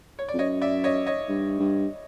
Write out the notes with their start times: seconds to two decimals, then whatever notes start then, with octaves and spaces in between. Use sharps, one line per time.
0.19 C#5
0.29 D5
0.34 F2
0.39 F#2 C#5 D#5
0.62 D5 E5
0.84 C#5 D#5
1.06 C#5 D#5
1.29 G2
1.59 G2